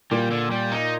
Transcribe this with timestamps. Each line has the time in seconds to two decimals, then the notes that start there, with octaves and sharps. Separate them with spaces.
0.11 A#2 G3
0.31 D3
0.51 G3
0.71 D#4